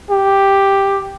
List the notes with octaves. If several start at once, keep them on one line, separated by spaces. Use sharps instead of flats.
G4